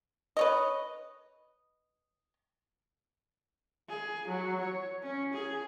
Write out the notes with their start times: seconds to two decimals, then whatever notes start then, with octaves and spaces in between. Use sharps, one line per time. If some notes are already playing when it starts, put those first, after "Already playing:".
0.37 B4 C#5 D#5
3.89 G#4
4.28 F#3
4.61 C#5
5.03 C#4
5.32 G#4